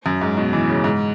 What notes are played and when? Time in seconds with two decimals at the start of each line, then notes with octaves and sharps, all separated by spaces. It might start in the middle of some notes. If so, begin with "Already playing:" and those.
0.06 F#2
0.21 G#2
0.37 B2
0.53 E3
0.69 C#3
0.84 G#2